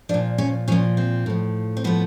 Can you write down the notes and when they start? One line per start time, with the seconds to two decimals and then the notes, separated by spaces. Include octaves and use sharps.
0.09 F3 D4
0.14 A#2
0.38 C#4
0.68 A#2 F3 C#4
0.97 C4
1.26 A2 F3
1.77 C4
1.84 A2 F3 B3